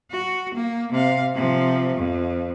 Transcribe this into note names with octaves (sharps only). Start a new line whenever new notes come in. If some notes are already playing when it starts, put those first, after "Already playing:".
F#4
A#3
C3 F5
C3 F3
F2